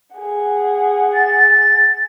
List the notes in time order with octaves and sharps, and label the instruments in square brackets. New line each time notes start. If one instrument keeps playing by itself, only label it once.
[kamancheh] G#4 F#5
[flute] A6